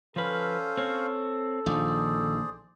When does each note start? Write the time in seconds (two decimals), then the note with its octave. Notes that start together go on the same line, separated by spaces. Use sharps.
0.16 F3 C#4 A4 B4 C5 F5
0.77 C4 C#5
1.66 A#1 D#3 G#4 C5 D5